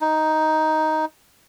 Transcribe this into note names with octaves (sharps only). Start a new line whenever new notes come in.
D#4